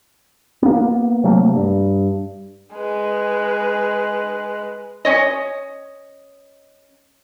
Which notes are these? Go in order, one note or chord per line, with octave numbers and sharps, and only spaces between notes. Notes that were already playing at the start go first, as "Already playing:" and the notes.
A#3 B3
C3 F#3 A3 A#3
G2
G#3 B4
C#4 C#5 D#5